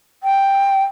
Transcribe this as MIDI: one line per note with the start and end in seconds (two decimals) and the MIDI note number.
0.23 0.85 79